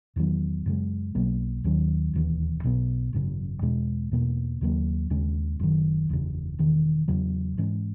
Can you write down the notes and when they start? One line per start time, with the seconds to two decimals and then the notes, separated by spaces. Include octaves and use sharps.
0.16 E2 D#3 F#3 B3
0.66 F#2 C#3 G#3
1.15 B1 B2 F#3 A#3
1.64 D#2 D#3 F#3 C#4
2.13 E1 D#2 C#3 E3
2.64 B1 B2 F#3 B3
3.13 G#1 F#2 C#3
3.62 E2 B2 G#3
4.11 E2 B2 A#3
4.61 D#2 C#3 F#3 A#3
5.10 D#2 C#3 G#3 C#4
5.59 F#1 F#2 D#3
6.09 F#1 E2 C#3
6.59 E1 E2 D#3
7.08 E2 C#3 F#3
7.57 G#2 E3 G#3 C#4